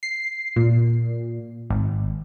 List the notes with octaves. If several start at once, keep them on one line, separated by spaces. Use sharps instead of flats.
C7
A#2
G#1